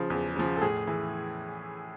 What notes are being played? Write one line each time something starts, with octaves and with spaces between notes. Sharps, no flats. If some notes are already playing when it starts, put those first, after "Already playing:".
Already playing: C#3 F3
E2
C#3 F3
A4
A2 G#4
E3